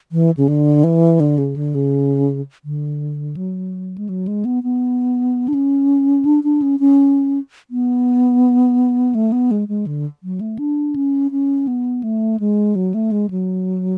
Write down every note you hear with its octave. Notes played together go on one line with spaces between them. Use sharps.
E3
C#3
D3
E3
D3
C#3
D3
C#3
D3
F#3
G#3
F#3
G#3
B3
B3
D4
C#4
D4
D4
C#4
C#4
B3
A3
B3
G#3
G#3
D3
F#3
A3
D4
C#4
C#4
B3
A3
G#3
F#3
A3
G#3
F#3